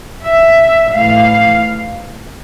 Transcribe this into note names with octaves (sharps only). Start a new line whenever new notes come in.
E5
A2 E3 A3 F5